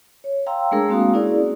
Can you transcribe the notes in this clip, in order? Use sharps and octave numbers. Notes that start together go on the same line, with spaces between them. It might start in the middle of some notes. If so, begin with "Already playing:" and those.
C#5
F5 G5 A#5 C6 E6
G#3 A3 D4 G#4 A#4 E6
G#3 A#3 C4 F#4 F5 D#6
C#4 E4 G#4 A#4 D5